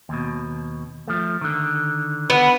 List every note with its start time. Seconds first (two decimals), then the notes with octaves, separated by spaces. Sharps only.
0.09 D#2 B2
1.08 F3 A3
1.41 D3 D#3
2.30 B3